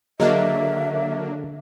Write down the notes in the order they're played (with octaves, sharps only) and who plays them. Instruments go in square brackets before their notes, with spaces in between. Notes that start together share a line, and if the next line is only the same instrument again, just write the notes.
[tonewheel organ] D3 [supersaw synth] F#3 A#3 D4 [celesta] G#4 D#5 [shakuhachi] E5